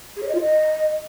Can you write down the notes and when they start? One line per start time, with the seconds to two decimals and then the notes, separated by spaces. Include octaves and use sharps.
0.17 G#4
0.23 C#5
0.29 D#5
0.35 F4
0.41 D#5